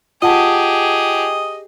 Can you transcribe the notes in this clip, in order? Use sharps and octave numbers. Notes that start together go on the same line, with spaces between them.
F4 G4 G#4 D#5 F#5 A5